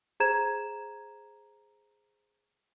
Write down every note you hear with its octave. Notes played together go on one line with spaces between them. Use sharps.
G#4 C5 A#5 G#6 E7